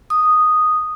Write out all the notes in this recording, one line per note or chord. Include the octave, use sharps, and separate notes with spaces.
D#6